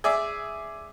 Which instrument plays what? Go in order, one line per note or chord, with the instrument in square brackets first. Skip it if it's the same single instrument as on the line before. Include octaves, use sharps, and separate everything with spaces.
[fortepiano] G#4 D5 E5